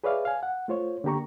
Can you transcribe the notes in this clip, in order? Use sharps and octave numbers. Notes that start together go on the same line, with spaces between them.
G#4 B4 C#5 D5 E5 F5
F5 G#5
F#5
A3 F4 C5 C#5
D3 A#3 G4 A#5 C#6